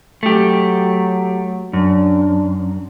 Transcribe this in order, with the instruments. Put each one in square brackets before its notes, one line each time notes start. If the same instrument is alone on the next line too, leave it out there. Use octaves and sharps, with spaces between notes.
[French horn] F#3 [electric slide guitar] A3 G4
[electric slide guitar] F#2 [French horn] D4